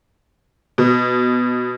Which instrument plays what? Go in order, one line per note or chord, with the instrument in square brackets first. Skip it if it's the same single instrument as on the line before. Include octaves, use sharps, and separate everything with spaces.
[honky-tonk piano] B2